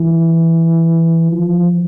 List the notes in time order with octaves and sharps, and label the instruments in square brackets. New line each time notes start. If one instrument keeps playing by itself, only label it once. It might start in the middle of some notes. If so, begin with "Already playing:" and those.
Already playing: [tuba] E3
F3